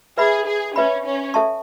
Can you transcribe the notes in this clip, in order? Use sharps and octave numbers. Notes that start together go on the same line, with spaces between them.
G#4 B4 E5 B5
G#4
C#4 B4 E5 B5
C#4
A4 E5 A5 C#6